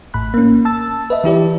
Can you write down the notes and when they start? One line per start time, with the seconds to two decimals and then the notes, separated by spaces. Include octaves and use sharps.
0.14 A1 A2 B5 F#6
0.34 A#3 C#4
0.65 A5 E6 A6
1.10 B4 D#5 E5
1.24 E3 E4 G4 D5